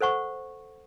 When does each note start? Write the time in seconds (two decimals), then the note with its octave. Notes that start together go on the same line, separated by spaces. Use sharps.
0.01 A4 C5 F#5 C#6